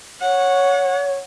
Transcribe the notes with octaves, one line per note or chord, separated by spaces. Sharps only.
C#5 F#5